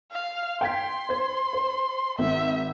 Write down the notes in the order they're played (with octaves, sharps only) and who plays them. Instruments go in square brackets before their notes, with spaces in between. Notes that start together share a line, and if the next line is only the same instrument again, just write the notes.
[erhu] F5
[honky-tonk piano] G5 G#6 B6 [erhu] C6
[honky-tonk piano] C5 G#6
C5
[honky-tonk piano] G#1 [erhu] E5